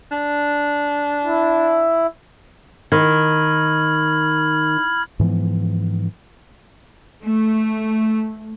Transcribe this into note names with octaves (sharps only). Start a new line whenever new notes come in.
D4
E4
D#3 B5 F6 G#6
G#2 E3 F3 B3
A3